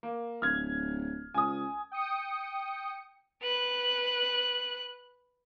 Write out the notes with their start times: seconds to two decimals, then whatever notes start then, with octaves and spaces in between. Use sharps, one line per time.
0.03 A#3
0.42 D1 F6 G#6
1.34 C#2 G#5 D#6
1.92 G5 D#6 C#7
3.42 B4 F#6